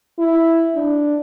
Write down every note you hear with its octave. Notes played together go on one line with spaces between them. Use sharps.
E4
D4